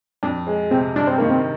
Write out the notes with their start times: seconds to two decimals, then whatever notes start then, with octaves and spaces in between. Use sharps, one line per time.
0.23 F2 D4
0.47 G#3
0.71 C3 C4
0.96 G2 D4
1.07 C4
1.18 D#3 A#3
1.30 C4